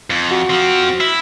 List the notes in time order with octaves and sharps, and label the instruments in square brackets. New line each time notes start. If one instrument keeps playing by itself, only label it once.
[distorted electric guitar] F2
[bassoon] F#4
[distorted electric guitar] F3 C4
E4